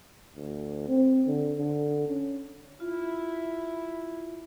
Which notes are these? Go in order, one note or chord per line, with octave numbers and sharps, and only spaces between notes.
D2
C4
D3
D3
C#4
E4 F4